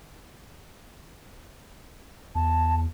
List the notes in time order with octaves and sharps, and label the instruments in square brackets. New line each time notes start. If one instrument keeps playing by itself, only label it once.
[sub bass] E2 [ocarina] A5